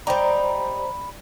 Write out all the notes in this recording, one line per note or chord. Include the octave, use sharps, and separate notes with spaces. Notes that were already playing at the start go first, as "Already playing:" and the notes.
G3 D#4 C5 D5 G5 A#5 B5